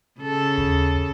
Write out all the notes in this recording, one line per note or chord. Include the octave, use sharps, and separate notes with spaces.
C#3 A4
D#2